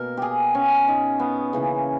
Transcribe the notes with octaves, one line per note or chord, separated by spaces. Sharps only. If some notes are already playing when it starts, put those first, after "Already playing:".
Already playing: B2 A#3 A#4
G4 G#4
C#4
D#4
B3
C#3 E3 A#3